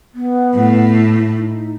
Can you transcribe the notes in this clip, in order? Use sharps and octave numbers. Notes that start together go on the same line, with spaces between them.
B3
A2
D#4